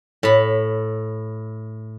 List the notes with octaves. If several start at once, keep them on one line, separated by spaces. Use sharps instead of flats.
A2 B5